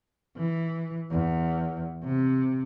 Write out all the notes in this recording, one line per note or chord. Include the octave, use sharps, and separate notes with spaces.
E3
E2
C3